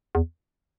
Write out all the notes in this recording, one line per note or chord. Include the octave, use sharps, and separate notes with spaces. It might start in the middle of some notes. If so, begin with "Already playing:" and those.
E2